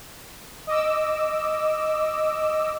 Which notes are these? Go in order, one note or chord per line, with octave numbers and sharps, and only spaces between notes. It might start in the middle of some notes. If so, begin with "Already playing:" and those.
D#5 D6 E6